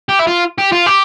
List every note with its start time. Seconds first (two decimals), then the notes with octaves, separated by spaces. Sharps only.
0.09 G4
0.19 E4
0.27 F4
0.58 G4
0.73 F4
0.87 G4